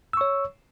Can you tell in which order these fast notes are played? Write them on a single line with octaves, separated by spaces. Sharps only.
E6 C#6 C#5